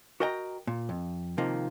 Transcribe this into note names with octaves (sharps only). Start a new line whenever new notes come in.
F#4 A#4 D#5 G5 G#5 A#5
A#2
F2
C3 D#3 F3 A#3